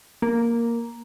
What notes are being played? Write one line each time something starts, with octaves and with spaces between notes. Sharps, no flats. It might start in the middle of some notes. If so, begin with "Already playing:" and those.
A#3